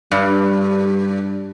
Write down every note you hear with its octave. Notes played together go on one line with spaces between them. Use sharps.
G2 G3